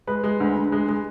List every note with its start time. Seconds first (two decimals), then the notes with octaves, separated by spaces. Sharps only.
0.07 G#3 B4
0.24 G#3
0.40 D2
0.56 D2
0.72 G#3
0.89 G#3